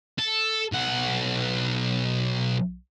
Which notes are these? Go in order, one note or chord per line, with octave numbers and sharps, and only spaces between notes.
A4
B1 F#5